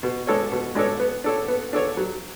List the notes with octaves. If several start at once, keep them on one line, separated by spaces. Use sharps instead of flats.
B2
G#3 D4 A4 C#5
B2
G#3 D4 A4 C#5
B3
D4 A4 C#5
B3
D4 A4 C#5
F#3